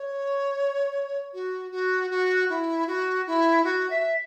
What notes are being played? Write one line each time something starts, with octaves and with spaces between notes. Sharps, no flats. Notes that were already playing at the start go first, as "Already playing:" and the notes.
Already playing: C#5
F#4
F#4
F#4
E4
F#4
E4
F#4
E5